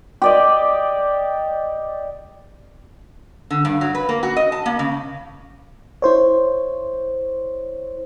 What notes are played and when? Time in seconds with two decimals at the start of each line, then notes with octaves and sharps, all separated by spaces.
0.22 G4 D5 D#5
3.50 D3
3.65 G2
3.81 F#3
3.95 B4
4.09 A#3
4.23 F#4
4.36 D#5
4.52 A5
4.66 A#3
4.79 C#3
6.02 E4 C5 C#5